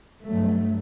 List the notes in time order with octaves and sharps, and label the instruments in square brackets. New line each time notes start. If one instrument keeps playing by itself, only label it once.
[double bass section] G2 F#3 A3